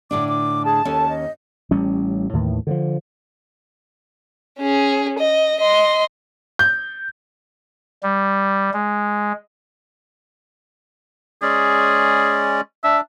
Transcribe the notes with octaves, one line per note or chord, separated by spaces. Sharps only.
A2 D3 D4 D6
D6
G#4 A5
D#2 C#4 A4
D#5
A1 G3 C#4
D#2 A2 D#3 E3
D3 E3 F3
C#4 G#4
D#5
D#5 C6
G6
G3
G#3
G#3 C#4 G#4 D5
D4 E5